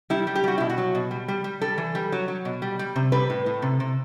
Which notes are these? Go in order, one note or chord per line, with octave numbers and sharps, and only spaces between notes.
G3 E4
G3
G4
G3 F#4
B2 E4
F#4
F#3
B2
G3
G3
G3
G3 A4
E3
G3
F#3
F#3
B2
G3
G3
C3
G3 B4
A2
A2
C3
C3